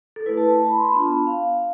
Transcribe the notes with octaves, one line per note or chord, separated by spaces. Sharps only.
A4
A3 E4 B4
A5
A5
A5
B5
C6
B5
B3 D4 F4 A5
F5